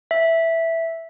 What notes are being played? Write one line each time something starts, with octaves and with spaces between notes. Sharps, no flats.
E5